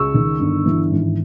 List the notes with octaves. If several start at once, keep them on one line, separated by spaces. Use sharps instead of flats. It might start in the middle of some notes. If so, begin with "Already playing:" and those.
Already playing: C#2 C#6 E6
D#3
G1
E3
G#1